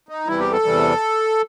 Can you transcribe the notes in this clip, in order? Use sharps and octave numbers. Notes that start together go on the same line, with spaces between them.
D#4
E2 C3 E3 G3 E4
G4
A4
E2 C3 E3 G3